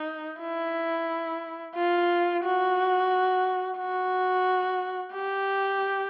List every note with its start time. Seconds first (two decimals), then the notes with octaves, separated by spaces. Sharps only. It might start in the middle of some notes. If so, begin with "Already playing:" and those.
Already playing: D#4
0.40 E4
1.75 F4
2.43 F#4
3.78 F#4
5.13 G4